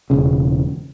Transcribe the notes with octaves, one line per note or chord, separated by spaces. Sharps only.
E1 C#3